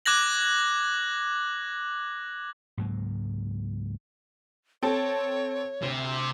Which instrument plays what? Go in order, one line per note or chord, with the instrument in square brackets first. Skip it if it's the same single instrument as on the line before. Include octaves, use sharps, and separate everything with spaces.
[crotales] D6 F#6 G#6 A#6 F#7
[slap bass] C#2 G#2 F#3 A#3
[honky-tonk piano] C4 A4 A5 [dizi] C#5
[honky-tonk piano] D2 [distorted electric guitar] C3